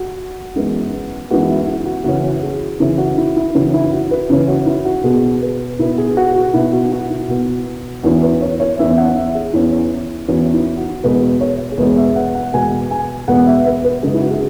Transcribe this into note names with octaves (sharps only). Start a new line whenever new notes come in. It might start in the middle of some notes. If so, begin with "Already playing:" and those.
Already playing: F#4
F#2 E3 G#3 B3
F#2 E3 G#3 B3 F#4
E4
F#4
F#4
F#2 C#3 E3 C#4 F#4
G#4
F#2 C#3 E3 C#4 E4
F#4
E4
E4
F#2 C#3 E3 C#4 F#4
E4
F#4
B4
F#2 C#3 E3 C#4
F#4
E4
F#4
B2 B3 G#4
B4
B2 B3 E4
G#4
F#4
F#4
B2 B3 E4
F#4
F#4
E4
B2 B3 F#4
E2 E3 C#4 F#4
B4
C#5
C#5
E2 E3 C#4 E5
F#5
E5
G#4
E2 E3 C#4 E4
E2 E3 C#4 F#4
E4
F#4
E2 B2 G#3 B3 B4
C#5
G#4
E2 B2 G#3 B3 B4
E5
F#5
F#5
E2 B2 G#3 B3 G#5
G#5
E2 B2 G#3 B3 F#5
E5
B4
B4
F#2 C#3 G#3 G#4
E4
F#4
G#4